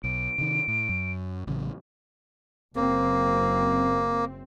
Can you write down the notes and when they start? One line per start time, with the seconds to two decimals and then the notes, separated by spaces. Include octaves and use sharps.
0.04 B1 D7
0.38 C3 D#3
0.68 A2
0.89 F#2
1.47 A1 C#3 F#3
2.76 F#1 A#3 C4